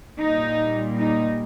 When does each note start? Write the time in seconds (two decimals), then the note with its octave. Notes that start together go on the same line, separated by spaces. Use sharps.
0.18 A#2 G3 A#3 D#4
0.96 D#4